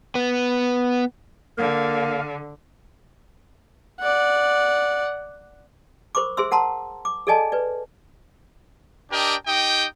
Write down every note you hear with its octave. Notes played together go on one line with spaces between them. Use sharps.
B3
D3 A#3 F5
D5 F#5
A#4 C5 B5 C#6 D6
G#4 C5 E5 C6 E6
A#4 F#5 A5 A#5 C6
D6
G#4 A4 D5 D#5 G#5 A5
B4 D5
D4 G4 A#4 D#5 G5
D#4 G4 D#5 G5